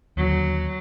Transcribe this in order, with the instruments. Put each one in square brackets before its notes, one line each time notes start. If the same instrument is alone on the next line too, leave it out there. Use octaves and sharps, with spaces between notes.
[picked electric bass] D#2 D3 [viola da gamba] F#3